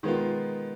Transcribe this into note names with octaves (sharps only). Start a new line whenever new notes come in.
D#3 G#3 B3 F4